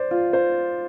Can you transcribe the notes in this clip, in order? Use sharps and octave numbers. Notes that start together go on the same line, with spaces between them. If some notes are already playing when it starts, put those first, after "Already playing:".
Already playing: C5 D5
F4
C5